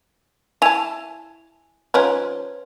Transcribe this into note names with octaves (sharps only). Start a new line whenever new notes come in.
E4 G#5 A5 F7
F3 C#4 D#4 B4 C#5 C6